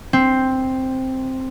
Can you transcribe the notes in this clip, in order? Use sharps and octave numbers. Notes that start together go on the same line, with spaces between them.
C4